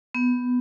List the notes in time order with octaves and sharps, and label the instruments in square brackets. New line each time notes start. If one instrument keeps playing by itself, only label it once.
[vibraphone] B3